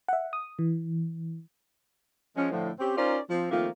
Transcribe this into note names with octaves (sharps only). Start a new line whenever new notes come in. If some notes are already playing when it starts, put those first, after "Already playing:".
E5 F#5
D#6
E3
F3 G#3 C#4
A2 D3 F3
C4 C#4 G4
C#4 D#4 F4 A#4 C5 D5
F3 C4
D#3 F3 A3 A#3 C4 F4